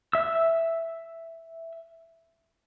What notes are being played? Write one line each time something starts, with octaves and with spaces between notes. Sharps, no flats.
E5 E6